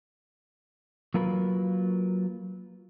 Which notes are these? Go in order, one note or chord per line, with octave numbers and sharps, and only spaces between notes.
F#3 A#3 F4 A#4 B4